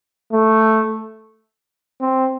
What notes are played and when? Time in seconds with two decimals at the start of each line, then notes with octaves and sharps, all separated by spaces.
0.32 A3
2.01 C4